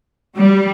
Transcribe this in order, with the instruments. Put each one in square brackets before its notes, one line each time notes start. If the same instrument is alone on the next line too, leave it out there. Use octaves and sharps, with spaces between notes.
[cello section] G3